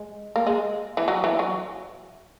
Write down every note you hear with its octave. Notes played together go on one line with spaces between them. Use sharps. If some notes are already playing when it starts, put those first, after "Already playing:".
Already playing: G#3
A#3
G#3
E3
F#3
E3
F#3